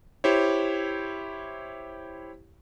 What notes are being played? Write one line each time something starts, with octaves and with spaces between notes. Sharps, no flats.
E4 G4 C5 C#5